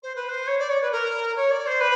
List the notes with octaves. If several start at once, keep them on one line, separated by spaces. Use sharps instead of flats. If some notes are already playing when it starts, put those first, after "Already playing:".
C5
B4
C5
C#5
D5
C#5
B4
A#4
C#5
D5
C5
B4